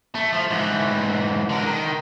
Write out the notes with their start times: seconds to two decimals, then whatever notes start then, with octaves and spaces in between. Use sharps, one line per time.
0.15 A3
0.33 F3
0.51 G#2 E3
1.49 D3 A#4
1.66 D#3